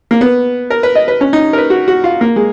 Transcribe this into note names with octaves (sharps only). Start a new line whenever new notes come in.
A#3
B3
A#4
B4
D#5
B4
C#4
D#4
A#4
B4
F#4
F#4
F4
A#3
G#3